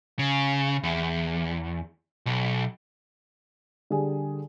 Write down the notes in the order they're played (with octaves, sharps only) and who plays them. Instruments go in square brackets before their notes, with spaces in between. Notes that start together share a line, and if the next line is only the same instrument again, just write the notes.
[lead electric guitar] C#3
E2
B1
[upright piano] D3 G3 G#4